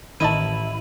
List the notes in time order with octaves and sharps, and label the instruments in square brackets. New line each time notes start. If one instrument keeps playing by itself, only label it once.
[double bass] A1 [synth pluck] D#3 D#5 A5 [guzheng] E4 [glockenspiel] D#7 F#7